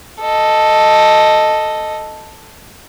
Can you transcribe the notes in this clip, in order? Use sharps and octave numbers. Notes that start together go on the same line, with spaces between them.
A4 D#5